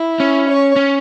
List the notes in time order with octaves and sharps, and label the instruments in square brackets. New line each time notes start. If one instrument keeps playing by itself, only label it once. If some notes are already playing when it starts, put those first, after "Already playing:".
Already playing: [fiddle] E4
[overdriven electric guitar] C#4
[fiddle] C#5
[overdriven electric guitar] C#4